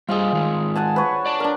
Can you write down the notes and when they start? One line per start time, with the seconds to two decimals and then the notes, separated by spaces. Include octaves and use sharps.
0.09 G3 F4 G#4 C5 D#5
0.33 D#3 G#3
0.75 F#5 G#5 A5
0.96 B4 C#5
1.26 D5 A5
1.40 D4 A#4